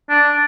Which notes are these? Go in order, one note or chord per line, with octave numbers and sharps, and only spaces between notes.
D4